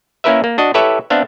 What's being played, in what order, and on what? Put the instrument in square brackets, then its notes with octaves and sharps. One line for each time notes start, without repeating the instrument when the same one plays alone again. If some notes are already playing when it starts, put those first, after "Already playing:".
[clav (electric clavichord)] A#3 C#4 E4 A#4 B4 E5
A#3
D4 F#4 D#5
E4 G4 A4 B4 C#5 E5
B3 C4 D4 E5 F5